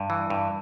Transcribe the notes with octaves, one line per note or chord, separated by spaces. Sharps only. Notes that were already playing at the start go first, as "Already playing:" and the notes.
Already playing: G2
E3
G2